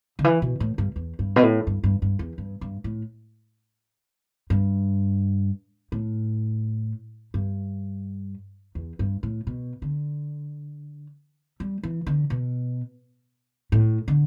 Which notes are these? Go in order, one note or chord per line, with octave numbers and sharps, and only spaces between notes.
D3
E3
B2
A2
G2
E2
G2
B2
A2
G2
G2
G2
E2
G2
G2
A2
G2
A2
G2
E2
G2
A2
B2
D3
G3
E3
D3
B2
A2
D3